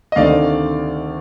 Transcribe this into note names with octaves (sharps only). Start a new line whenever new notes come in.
D#5
D2 C3 D#3 A3 D5 F5